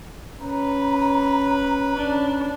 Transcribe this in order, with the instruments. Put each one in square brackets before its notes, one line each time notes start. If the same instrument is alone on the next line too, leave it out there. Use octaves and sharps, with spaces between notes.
[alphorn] C#4 [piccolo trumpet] B4 [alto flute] A#5
[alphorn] C#4 [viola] D4